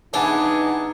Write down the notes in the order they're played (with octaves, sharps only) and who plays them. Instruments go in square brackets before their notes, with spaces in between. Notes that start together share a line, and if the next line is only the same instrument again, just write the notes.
[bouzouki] E3 B3 [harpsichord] D4 [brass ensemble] D#4 [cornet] G#4